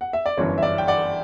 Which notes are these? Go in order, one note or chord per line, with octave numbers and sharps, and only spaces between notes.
F#5
E5
D5
G1 F#2 E3 C#5
E5
D5
G5
D5 F#5